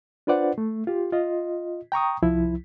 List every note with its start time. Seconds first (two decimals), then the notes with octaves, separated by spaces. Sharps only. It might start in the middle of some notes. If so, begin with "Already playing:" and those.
0.27 D4 F4 B4 C5 D5 F#5
0.58 A3
0.87 F4 G4
1.12 F4 D#5
1.92 G5 A#5 C#6 D#6
2.22 C2 F3 E4